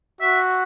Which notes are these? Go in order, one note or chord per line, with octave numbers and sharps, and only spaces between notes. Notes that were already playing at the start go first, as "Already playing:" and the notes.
F#4 E5